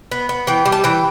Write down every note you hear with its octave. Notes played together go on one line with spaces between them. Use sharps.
B3
B3
E3 G5
G3
A5
E3 G5